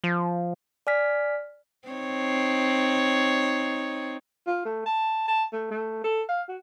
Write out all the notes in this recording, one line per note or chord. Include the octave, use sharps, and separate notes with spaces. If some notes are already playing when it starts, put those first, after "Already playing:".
F3
D5 G#5 F6 B6
C4 D#4 C#5
F4
A3
A5
A5
A3
A3
A4
F5
F#4